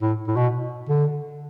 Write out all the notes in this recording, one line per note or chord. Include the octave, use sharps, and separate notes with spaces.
A2
A2
B2
D3